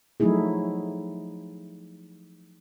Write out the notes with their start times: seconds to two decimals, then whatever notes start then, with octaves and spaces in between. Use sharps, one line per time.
0.20 F3 F#3 A3 D#4 E4 G#4